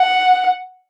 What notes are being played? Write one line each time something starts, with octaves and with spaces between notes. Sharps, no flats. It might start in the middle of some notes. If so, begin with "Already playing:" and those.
Already playing: F#5